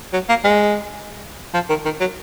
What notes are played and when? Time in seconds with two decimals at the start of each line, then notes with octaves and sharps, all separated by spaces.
0.13 F#3
0.29 A#3
0.44 G#3
1.54 F3
1.69 D#3
1.85 D#3
2.00 F#3